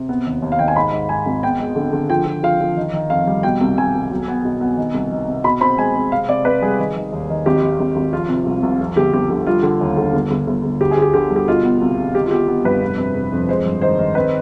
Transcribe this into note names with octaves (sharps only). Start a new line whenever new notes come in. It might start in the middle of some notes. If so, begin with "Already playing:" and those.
Already playing: C3
B3
D#2
D#2
F5
D#3 G5
G#5
G#2 B5
G#2
G#2 G#5
G#1
B3 G5
G#3
D3
D3
F3 G5
F3
F3 F5
F3
D#3
D#3
F2 F5
G3
B2 G5
C2
C2 G#5
C2
B1
B3
B2
B3
D#3
C2
D#3
C3
B2 B5
C4 B5
G#3 G#5
C4
C3 F5
C3 D5
C3 B4
G3 G#4
D#3
D#3
D#2
D#3
G#1 G4
D#3
G#1
G#1
F3 F4
C3
C2
C2
F2
G1 G4
G1 G4
D3 G4
G3 F4
D3
D#2
D3
G1
G1
G1
G1
D2 G4
G#4
D2
G4
D3 G4
G3
G4
B2 F4
B3
C2
C2
D#3 G4
F4
B3 G4
B3
G2 B4
F1
C3
F1
F2
G#3 C5
G2
D#3 C5
D#3
C4 B4